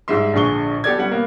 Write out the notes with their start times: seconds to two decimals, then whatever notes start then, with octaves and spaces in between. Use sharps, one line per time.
0.08 G#2 G3 G#3 E5 C6
0.33 A#1 D3 G#4 C#6 G7
0.84 B3 G4 A4 D5 G#6
0.98 G3 B3 C#4 F#5
1.11 A#3 B3